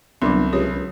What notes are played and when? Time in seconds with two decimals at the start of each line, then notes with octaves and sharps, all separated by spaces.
0.22 G1 C2 F#3 C6
0.53 C#2 G4 C#5
0.74 C#2